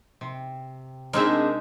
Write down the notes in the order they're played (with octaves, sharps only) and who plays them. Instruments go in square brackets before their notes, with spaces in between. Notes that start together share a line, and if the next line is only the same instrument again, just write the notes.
[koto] C3
[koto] G#3 D#4 E5 [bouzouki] A#3 C4 G#4 [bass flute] D4